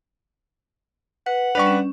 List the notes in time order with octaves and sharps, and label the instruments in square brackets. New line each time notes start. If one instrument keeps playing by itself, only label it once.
[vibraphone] B4 [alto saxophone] F#5
[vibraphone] G3 D4 [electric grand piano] B4 D5 C#6
[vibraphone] C#4